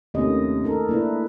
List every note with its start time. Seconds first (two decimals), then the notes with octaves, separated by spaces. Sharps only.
0.14 D#2 C3 A3 A#3 C#4 D#5
0.64 D#4 A4 A#4
0.89 A#3 D4 E4 B4